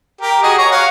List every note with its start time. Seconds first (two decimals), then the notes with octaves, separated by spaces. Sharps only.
0.21 G4 A#4
0.43 F#4 G#4 D#5
0.58 C#5 A#5 C#6
0.71 C#5 F5 F#5